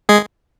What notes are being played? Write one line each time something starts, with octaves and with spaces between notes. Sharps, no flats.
G#3 G#4